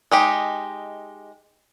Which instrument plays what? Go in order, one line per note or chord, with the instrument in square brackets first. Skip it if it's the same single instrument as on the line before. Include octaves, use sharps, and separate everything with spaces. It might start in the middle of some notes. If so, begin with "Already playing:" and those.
[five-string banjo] G#3 D#4 G4